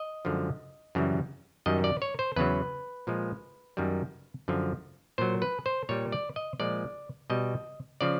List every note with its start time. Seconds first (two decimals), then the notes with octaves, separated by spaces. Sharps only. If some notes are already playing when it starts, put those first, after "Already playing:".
Already playing: D#5
0.25 F#2 D3 F3 G#3
0.95 F#2 C#3 E3 G3
1.66 F#2 D#3 G3 D#5
1.84 D5
2.02 C#5
2.19 C5
2.36 E2 C#3 F#3 B4
3.07 A#2 F3 G#3
3.77 F#2 D#3 G3
4.48 F#2 D3 F3
5.18 A#2 F#3 C5
5.42 B4
5.66 C5
5.89 A#2 G3 C#5
6.12 D5
6.36 D#5
6.59 A#2 F3 G#3 D5
7.30 B2 G3 D#5
8.01 C#3 F3 D5